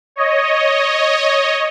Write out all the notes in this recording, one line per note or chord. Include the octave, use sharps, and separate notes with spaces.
C#5 D#5